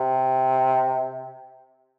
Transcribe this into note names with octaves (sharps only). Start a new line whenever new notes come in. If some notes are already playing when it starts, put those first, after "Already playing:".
Already playing: C3